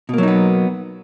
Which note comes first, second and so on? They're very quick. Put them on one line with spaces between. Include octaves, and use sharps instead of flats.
B2 A#3 F#3 D#4 B3